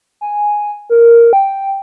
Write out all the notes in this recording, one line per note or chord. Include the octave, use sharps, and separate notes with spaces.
G#5
A#4
G5